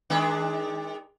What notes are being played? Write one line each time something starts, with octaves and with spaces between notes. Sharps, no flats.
D#3 G#3 D4